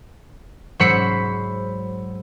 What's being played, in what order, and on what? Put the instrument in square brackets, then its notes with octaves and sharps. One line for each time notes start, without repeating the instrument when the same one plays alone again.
[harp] G#2 F#3 C5 B5 E6 C#7